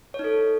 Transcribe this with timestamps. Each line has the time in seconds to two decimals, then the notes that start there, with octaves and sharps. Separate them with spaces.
0.14 C#5
0.19 D#4
0.24 A4